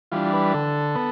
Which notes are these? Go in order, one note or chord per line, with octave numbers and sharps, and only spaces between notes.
E3 G3 D4 F4
B4
D3 A4
B3